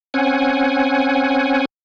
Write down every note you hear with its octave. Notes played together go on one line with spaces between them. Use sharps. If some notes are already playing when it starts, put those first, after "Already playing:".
C4 C#4 F#5 G#5